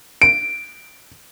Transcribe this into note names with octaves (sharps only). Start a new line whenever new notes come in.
D7